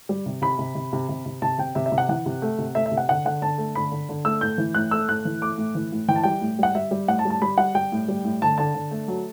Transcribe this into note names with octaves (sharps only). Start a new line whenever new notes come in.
G3
C3
C3 B5
C3
C3
C3
C3
C3
C3 A5
C3 G5
C3 E5
E5
C3
F#5
E3 F#5
C3
A3
C3
A3 E5
E5
C3
F#5
D3 F#5
D3 F#5
D3 A5
A3
D3 B5
D3
D3
A3 E6
A2 G6
E3
A2 F#6
A3 E6
A2 F#6
E3
A3 D6
A2
E3
A2
E3 G5
A5
G3 G5
A2
G3 F#5
G3 E5
G3
A2 F#5
A5
G3
A5
G3 B5
G3 F#5
G3 G5
A2
G3
A2
D3 A5
D3 A5
D3
A3
F#3